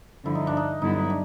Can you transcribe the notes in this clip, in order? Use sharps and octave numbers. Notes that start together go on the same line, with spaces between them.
G2 D3 F3 E4
D#4
D4
D#4
G2 D3 F#3 B3 D#4 E4
D4